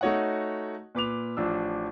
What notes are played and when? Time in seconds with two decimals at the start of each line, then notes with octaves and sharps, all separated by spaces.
0.01 A3 D#4 F#4 C#5 D#5 F#5
0.95 A#2 B4 D6 F7
1.37 A1 F3 D4 E6